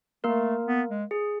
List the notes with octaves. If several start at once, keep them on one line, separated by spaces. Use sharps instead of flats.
A3 A#3 A#4
B3
G#3
G#4